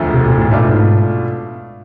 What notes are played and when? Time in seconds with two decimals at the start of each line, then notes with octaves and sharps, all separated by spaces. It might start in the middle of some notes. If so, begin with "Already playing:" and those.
Already playing: E1 D2 D3 F3 A3
0.14 C3
0.26 B2
0.38 A2
0.50 G#2 B2 A3 D4 F4
0.69 G#2